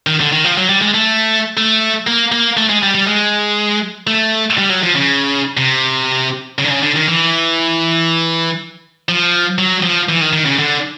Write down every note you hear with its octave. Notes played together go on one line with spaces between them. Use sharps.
D#3
D3
D#3
F3
F#3
G3
G#3
A3
A3
A#3
A#3
A3
G#3
G3
G3
G#3
A3
G3
F#3
F3
C#3
C3
C#3
D3
C#3
D3
D#3
E3
F3
F#3
F3
E3
D#3
D#3
C#3
D3